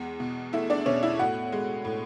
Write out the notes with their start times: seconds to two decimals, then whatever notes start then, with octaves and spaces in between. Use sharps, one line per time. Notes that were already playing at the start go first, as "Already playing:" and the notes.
Already playing: E2 G#3
0.20 B2
0.53 A3 E4 E5
0.70 D4 D5
0.86 B2 C#4 C#5
1.03 E4 E5
1.19 A2 F#4 F#5
1.52 G#3
1.85 A2